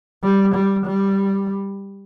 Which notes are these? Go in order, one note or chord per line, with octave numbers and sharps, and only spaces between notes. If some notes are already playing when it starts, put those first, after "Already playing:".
G3
G3
G3